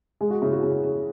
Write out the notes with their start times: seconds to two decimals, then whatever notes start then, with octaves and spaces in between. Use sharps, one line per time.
0.21 G#3 G#4
0.30 F#4
0.42 C#3 E4
0.52 F#4
0.63 C#3
0.84 C#3